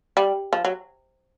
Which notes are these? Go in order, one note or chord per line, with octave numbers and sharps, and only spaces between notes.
G3
F3
F#3